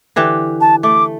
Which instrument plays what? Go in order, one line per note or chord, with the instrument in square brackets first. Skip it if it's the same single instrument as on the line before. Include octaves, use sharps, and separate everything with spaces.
[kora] D3 E3 G4
[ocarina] A5
[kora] A3 [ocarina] D6